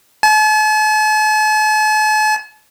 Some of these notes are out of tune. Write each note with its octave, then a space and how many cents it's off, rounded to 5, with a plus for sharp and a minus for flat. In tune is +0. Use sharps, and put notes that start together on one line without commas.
A5 -45